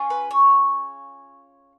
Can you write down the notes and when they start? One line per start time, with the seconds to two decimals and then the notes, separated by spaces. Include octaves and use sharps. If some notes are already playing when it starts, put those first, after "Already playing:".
Already playing: C#4 F4 G#4
0.10 B4
0.31 C#5